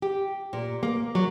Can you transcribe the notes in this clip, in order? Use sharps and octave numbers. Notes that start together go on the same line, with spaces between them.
G4
A#2
A#3
F#3